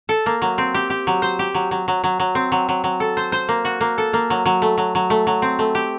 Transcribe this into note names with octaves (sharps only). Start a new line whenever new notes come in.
A4
A#3
F#3
C4
G4
G4
F#3
C5
G4
F#3
F#3
F#3
F#3
F#3
C4
F#3
F#3
F#3
A4
C5
C5
A#3
F#4
A#3
A4
A#3
F#3
F#3
A3
F#3
F#3
A3
F#3
C4
A3
G4